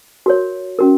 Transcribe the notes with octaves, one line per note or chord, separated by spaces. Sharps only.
F#4 A#4 C#5
C#4 F#4 A#4